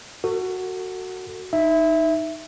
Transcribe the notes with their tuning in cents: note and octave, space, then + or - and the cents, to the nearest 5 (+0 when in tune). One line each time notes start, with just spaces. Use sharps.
F#4 +0 A4 +40
D#4 +0 E5 +0